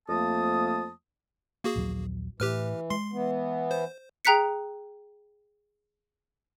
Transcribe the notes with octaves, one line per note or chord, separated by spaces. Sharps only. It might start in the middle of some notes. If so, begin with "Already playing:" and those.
F2 F3 A3 A#3 A5 D#6
A#3 F#4 G#4
A#1 D#2 F#3
A2 E3 G4 B4 F6
G#3 C6 C7
E3 B3
C5
G#4 G5 A#5 F#6 B6 C#7